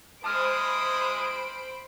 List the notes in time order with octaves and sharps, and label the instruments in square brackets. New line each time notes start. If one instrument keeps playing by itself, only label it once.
[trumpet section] G#3 E4 D#6 [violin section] C5 B5 D7 [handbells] A5 F6